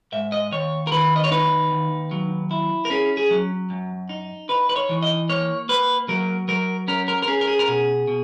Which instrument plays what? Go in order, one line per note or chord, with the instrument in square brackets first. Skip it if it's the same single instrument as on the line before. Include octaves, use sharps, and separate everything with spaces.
[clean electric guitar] G#2 E5
D#5
D#2 C#5
A#4
D#3 B4
D#5
C#5
D#4 B4
D#2
F#3
E4
A#4
C#4 G#4
G#4
F#3
F#2
D#4
D#4 B4
B4
C#5
E3
D#5
A#3 C#5
A#3 B4
F#3 A#4
F#3 A#4
C#4 A#4
A#4
A#4
C#4 G#4
A#4
G#4
A#4
B2 G#4
B2